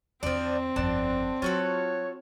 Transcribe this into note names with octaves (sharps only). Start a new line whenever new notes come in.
E2 D3 F3 C4 D4
G1 F2 D3 D4 A5
F#3 F4 F#4 A4 C#5